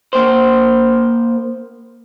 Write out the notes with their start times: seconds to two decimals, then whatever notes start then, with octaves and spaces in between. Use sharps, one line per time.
0.13 A#3 C5